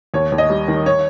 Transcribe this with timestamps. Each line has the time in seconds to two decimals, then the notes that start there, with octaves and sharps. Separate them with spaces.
0.14 D#2 C#5
0.32 D#2
0.38 D#5
0.50 G3
0.68 D#3
0.86 C#5